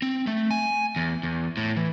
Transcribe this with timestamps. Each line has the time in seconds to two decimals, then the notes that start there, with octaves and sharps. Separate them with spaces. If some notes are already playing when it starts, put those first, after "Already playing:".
0.02 C4
0.27 A3
0.51 G#5
0.96 E2
1.23 E2
1.57 A2
1.77 E3